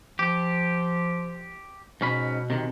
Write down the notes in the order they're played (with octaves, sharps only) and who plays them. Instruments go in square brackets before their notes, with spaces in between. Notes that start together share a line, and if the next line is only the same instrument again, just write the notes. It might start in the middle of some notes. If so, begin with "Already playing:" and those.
[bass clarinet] F3 [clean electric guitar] G4
[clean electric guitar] G#2 C#4 B5 [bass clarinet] B2
[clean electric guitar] C3 D#3